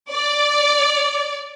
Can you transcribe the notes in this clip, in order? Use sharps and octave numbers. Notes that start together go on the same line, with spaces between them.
D5